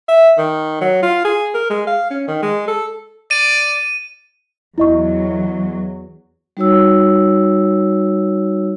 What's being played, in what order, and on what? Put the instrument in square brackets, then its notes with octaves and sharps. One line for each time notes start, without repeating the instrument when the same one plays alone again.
[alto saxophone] E5
D#3
F#3
F4
G#4
A#4
G#3
F5
C#4
D#3
G#3
A4
[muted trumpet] D5 [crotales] D#7
[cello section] E2 F#3 [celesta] E4 D#5 C#6
[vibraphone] G3 D#4 F#4 C#5 E6